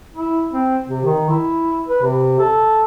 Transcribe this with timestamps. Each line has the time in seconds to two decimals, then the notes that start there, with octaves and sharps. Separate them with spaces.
0.14 E4
0.53 C4
0.89 C3
1.04 D#3
1.29 E4
1.88 B4
2.02 C3
2.39 A4